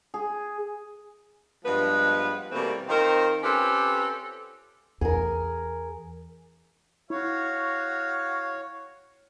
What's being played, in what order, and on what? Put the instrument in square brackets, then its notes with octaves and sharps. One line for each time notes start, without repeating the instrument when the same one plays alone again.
[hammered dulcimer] G#4
[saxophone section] G2 F3 G#3 B3 B4
B2 E3 G3 A3 A#3 C4
D#3 C4 D#4 F4 A#4 C5
C4 C#4 F4 G4 A4 B4
[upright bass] E2 [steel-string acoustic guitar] G#4 A#4
[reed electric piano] E4 [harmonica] F#4 F5 [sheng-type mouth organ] C#5